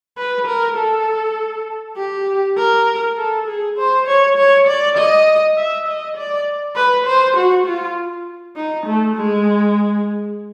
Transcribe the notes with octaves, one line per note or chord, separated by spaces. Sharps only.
B4
A#4
A4
G4
A#4
A4
G#4
C5
C#5
C#5
D5
D#5
E5
D#5
D5
B4
C5
F#4
F4
D#4
A3
G#3